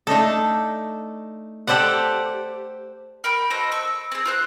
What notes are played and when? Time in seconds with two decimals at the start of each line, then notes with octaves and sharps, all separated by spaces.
0.07 A3 D4 D#4 A4
1.67 G4 A4 C5 D5 F#5
3.24 A#4 G5 B5
3.50 F#4 A4 C5 D#5
3.72 C#6 E6
4.12 C4 G#4
4.26 F4 C5 F#6